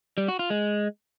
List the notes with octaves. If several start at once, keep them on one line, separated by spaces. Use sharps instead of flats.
G3
F#4
F4
G#3